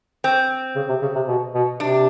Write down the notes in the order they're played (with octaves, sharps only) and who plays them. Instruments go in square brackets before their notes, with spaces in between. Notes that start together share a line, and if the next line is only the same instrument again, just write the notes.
[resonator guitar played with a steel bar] C4
[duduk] C#3
C3
C#3
C3
B2
B2
[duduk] C3 [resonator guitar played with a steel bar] D4